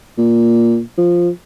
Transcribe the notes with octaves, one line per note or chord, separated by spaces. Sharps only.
A#2
F3